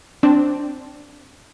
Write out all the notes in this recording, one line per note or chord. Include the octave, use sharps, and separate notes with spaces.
C4 D4